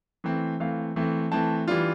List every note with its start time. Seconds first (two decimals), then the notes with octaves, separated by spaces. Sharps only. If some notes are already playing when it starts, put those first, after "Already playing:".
0.24 E3 A3 C4
0.60 E3 A3 C4 F5
0.96 E3 A3 C4
1.32 E3 A3 C4 A5
1.68 E3 G3 D4 F4